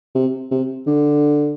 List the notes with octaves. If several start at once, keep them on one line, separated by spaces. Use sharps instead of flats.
C3
C3
D3